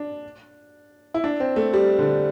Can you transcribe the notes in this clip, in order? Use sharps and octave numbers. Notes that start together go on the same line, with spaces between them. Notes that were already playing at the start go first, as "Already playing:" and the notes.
Already playing: D4
E4
D4
C4
A3
G3
D3